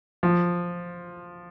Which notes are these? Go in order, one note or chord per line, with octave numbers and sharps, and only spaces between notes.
F3